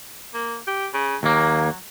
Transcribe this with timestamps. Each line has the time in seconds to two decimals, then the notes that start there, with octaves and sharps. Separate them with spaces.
0.34 A#3
0.67 G4
0.94 C#3
1.23 D#2 F#3 A#3